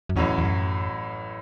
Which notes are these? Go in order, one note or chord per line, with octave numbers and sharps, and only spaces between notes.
F#2
A1 E2 A2 F#3 C#4
E2
F#2